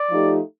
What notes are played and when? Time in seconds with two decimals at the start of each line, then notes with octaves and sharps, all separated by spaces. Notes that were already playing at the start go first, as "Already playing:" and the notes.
Already playing: D5
0.10 F3 A3 D#4 G4